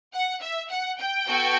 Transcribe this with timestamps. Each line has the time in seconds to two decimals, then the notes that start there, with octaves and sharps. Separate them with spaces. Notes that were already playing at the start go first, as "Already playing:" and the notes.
0.14 F#5
0.41 E5
0.70 F#5
0.99 G5
1.27 B3 F#4 A4